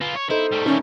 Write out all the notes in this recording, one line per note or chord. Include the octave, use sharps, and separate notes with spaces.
F4 B4
C#5
D#4 E4 A4 C5
G3 A3
D#3 C#4 D#4 E4